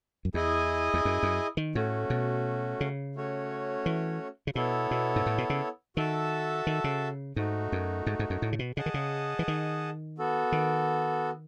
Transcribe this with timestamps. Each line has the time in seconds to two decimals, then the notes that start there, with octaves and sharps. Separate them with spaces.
0.25 F#2
0.34 E2 E4 G#4 D#5 G#5
0.94 E2
1.05 F#2
1.23 F#2
1.57 D#3
1.75 A2 A3 C#4 F#4
2.10 B2
2.81 C#3
3.15 A3 C#4 F#4 C#5
3.86 E3
4.47 C#3
4.55 B2 B3 E4 A4 C#5
4.91 B2
5.16 G#2
5.26 A2
5.38 B2
5.50 C#3
5.96 D#3 F#4 A4 E5 A5
6.67 D#3
6.84 C#3
7.36 G#2 A3 D#4 F#4
7.72 F#2
8.07 G#2
8.19 G#2
8.30 F#2
8.42 A2
8.53 C#3
8.59 B2
8.77 C#3 G#4 D#5 F#5 A5
8.86 D#3
8.94 C#3
9.39 E3
9.48 D#3
10.18 B3 F#4 A4
10.52 D#3